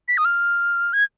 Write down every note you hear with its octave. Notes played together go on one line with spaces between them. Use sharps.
B6
D#6
F6
G#6